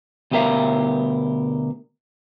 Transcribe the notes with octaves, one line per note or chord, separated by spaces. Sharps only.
D2 B2 G4 A#4 E5 F5